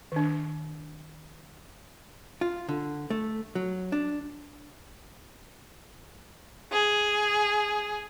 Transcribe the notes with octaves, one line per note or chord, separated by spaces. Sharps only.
D#3 D4
F4
D3
A3
F#3
D4
G#4